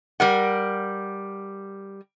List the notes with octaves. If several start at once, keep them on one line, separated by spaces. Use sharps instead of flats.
G3 A#4 F#5